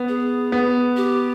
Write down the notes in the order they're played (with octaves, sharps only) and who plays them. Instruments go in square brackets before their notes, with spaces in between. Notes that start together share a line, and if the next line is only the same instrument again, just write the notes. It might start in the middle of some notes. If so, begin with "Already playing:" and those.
Already playing: [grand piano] B3
[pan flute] G#4
[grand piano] B3
[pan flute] G4